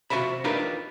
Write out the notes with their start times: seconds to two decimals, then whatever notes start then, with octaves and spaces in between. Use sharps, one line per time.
0.10 C3 A#3 F4 F#4 E5 B5
0.44 D4 D#4 F4 G4 A#4 B4